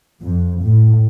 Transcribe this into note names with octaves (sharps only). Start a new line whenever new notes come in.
F2
A2